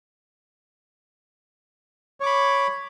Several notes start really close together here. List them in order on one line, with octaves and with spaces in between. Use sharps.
C#5 D6 B5